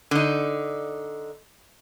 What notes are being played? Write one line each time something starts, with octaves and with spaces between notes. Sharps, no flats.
D3 D#4